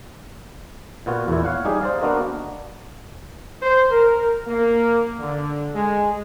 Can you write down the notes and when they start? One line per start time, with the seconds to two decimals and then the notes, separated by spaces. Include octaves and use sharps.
1.06 A#2 B3 F4 F#4
1.28 E2 A#2 E4
1.45 C#5 F5 F#5
1.65 G3 D#4 G4 G#4
1.81 C5 D5 F5
2.01 A#3 B3 D4 F#4 A#4 D#5
3.63 C5
3.91 A#4
4.48 A#3
5.20 D3
5.75 G#3